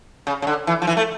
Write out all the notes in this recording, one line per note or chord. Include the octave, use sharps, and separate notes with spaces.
C#3
C#3
D3
E3
F3
E3
A3